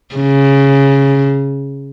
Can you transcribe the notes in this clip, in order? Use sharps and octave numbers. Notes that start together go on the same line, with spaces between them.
C#3